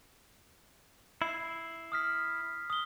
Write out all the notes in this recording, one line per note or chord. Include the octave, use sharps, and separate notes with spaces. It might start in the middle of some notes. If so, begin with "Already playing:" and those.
E4 C7
D#6 F6 B6
D#6 G7